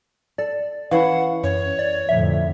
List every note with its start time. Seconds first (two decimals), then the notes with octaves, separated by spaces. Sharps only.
0.38 A4 D5
0.91 E3 C#4 E4 F5 F#5
1.43 F#2 C#5
1.79 D5
2.09 F2 A2 D3 E5